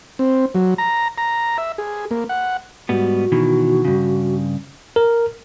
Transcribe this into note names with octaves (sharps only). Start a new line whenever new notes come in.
C4
F#3
A#5
A#5
E5
G#4
A#3
F#5
G#2 G3 B3 F#4
B2 D#3 E3
G2 C#3
A#4